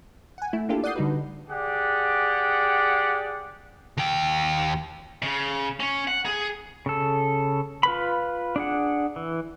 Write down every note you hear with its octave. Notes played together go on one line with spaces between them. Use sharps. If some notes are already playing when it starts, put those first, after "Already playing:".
F#5 G#5
A3 E4
A#3 D4 E4 F4 G4 A4
D5 F#5 D#6 G6 C7
D3 G3 D#4 F#4 B4
G4 G#4 D5 F#5
D#2 G5
C#3
C#4
F#5
G#4
C#3 A4
F4 B4 B5
D4 G#4 F#5
E3